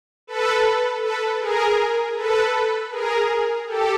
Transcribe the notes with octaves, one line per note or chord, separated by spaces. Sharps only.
A4 B4
A4 B4
G#4 A#4
A4 B4
G#4 A#4
G4 A4